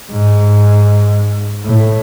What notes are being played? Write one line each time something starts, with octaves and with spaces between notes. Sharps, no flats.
G#2
A2